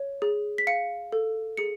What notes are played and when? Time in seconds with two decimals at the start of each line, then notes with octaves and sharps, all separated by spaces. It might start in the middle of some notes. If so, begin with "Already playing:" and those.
Already playing: C#5
0.22 G#4
0.58 B6
0.67 F5 C#7
1.12 A4
1.57 G#4 C#7